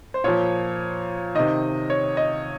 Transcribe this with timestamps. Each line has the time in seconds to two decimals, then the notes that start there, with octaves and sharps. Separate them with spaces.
0.14 C5
0.24 A#2 F3 C#5
1.35 C3 D#3 D#5
1.90 C#5
2.17 D#5